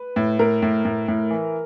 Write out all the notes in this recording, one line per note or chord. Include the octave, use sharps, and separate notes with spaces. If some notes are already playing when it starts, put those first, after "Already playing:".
Already playing: B4
A2
A2 A#4
A2
A2
A2
E3